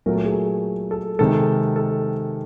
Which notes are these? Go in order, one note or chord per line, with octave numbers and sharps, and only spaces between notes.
A#2 F#3 A3 A#4
A4
G#4
A4
C3 D#3 G#3 A4
A4